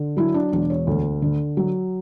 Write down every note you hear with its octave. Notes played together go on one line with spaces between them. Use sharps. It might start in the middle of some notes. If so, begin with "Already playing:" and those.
Already playing: D3
F#3 E4
D4
E1 D4
C#5
D2
D3
F#3